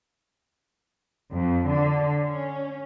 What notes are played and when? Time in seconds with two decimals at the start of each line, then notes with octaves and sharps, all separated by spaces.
1.32 F2
1.68 D3
2.18 C#4